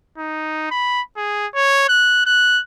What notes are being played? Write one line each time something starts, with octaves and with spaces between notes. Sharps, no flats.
D#4
B5
G#4
C#5
F#6
F#6